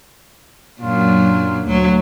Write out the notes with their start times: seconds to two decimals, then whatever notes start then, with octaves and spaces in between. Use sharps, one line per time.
0.82 F#2 A#2 F#3 D4 F4
1.66 D2 F#3